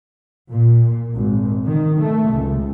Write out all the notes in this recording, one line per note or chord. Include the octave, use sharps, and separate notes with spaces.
A#2
G#1
D#3
A3
C#2